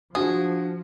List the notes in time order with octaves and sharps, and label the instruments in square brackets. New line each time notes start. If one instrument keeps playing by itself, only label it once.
[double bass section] F3 [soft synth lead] D4 [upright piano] F#4 [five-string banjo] G#4